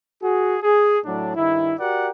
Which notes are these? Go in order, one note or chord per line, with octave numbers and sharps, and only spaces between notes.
F#4 G#4
G#4
A2 F#3 D4
G2 D#3 E4
F#4 G4 A#4 D5 F#5